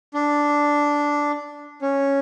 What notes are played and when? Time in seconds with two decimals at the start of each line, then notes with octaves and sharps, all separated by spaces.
0.14 D4
1.82 C#4